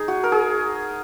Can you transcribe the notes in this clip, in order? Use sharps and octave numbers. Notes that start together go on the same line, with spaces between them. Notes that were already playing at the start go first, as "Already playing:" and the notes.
Already playing: D#4 G#4
F#4
A#4
G#4